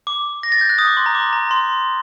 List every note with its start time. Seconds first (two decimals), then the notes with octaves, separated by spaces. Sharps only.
0.07 D6
0.43 A#6
0.52 A6
0.61 G6
0.70 F#6
0.79 D#6
0.87 D6
0.97 C6
1.06 A#5
1.15 D6
1.33 A#5
1.51 C6